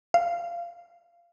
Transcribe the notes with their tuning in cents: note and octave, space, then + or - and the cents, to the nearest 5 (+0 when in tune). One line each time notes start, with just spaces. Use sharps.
F5 -20